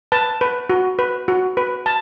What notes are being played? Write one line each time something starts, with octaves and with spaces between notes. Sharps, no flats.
B4 A5
B4
F#4
B4
F#4
B4
A5